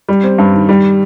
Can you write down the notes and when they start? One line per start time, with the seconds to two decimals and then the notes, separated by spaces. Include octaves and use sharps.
0.09 G3
0.24 C4
0.38 G2
0.54 D#3
0.69 G3